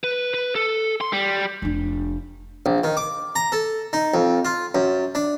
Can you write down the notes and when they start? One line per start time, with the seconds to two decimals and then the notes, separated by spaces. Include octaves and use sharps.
0.04 B4
0.34 B4
0.55 A4
1.01 C6
1.13 G3
1.62 F1 D4
2.66 A#1
2.84 D#3
2.97 D6
3.36 A#5
3.52 A4
3.93 D#4
4.14 F2
4.45 F4
4.75 F#2
5.15 D4